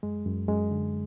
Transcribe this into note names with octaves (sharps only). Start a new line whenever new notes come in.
F#2 G#3
F#2
F#2 G#3
D3